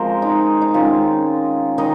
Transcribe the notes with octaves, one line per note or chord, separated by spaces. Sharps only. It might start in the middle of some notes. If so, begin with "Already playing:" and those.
Already playing: F3 G#3 C4 A#4 C5
D#4
D#4
D#3 G#3 C#4 F4
D#3 D#4 D#5